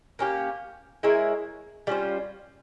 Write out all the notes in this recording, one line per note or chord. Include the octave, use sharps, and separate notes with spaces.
A#3 C#4 G4
G#3 E4 A#4 C#5
G3 C#4 F4 C5